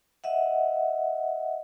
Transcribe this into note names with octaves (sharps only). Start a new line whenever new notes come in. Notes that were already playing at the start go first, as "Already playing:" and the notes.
D#5 E5 F#5